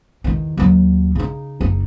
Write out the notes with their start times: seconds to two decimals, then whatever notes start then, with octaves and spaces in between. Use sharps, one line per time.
0.24 E2 D#3
0.57 D#2 F#3
1.15 C#3 D#4
1.61 F#1 D#4